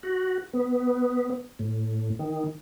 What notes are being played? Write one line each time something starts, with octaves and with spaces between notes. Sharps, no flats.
F#4
B3
A2
D#3